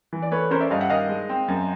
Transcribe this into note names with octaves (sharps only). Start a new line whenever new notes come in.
E3
D5
A3 B4 C#5
C#4 A#4 C5
D5 E5
G2 D#5 F5
E5 F#5
D#3 D#5 F5
G#3
C4
F#2